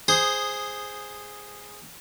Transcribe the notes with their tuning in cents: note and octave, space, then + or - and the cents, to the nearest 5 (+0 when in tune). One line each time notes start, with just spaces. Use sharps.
G#4 -5 C5 +0 D#6 -10